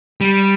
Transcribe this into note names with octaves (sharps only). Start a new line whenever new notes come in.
G3